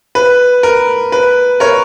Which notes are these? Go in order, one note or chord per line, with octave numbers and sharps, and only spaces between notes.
B4
A#4
B4
A#4 C#5